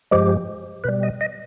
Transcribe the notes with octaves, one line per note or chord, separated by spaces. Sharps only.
G2 F3 G#3 G4
B2 G3 B4
D#5
D#5